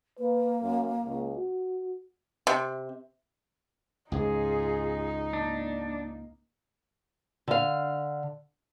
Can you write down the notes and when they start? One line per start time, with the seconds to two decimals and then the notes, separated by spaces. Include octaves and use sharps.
0.19 A#3 B4
0.63 F#2
1.05 C#2
1.37 F#4
2.47 C3
4.12 C#2 G#2 D#4 F4 G#4
5.33 A#3 D4
7.48 D3 F5